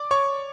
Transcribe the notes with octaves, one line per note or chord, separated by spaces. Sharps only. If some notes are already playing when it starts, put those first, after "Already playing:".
Already playing: D5 D6
C#5 C#6